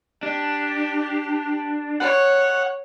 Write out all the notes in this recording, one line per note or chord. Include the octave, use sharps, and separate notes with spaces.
D4 G4
C#5 F#5